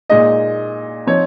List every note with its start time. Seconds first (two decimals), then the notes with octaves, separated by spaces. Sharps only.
0.10 A#2 G#3 D#4 D#5
1.07 F3 C4 D#4 C#5